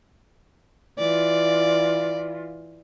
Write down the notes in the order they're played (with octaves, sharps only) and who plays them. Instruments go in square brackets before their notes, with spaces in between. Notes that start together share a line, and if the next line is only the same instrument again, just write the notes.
[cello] E3 F4 [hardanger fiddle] D5